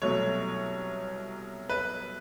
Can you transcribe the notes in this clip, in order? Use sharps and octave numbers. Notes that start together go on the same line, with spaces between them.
C2 B2 F#3 A3 C#5
B4